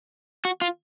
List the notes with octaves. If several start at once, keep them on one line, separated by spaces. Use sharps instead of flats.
F#4
F4